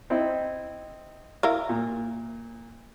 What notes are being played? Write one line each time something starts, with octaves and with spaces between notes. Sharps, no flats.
C4 D#4 E4
E4 A#4 F5
A#2